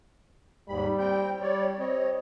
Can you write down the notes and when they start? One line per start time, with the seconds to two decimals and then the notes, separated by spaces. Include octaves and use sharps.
0.68 D#2 G#2 G3 B5
0.99 C4 G5 G6
1.41 G3 C#5 D5
1.79 C4 C#5 D#5